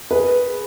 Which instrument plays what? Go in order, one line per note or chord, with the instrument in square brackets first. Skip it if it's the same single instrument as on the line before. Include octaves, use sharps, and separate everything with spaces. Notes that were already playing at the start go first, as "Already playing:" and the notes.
[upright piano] G#4 B4